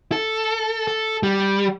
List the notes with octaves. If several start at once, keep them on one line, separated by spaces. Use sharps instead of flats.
A4
A4
G3